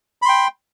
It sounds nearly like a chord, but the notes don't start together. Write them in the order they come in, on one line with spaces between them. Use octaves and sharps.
B5 C6 G5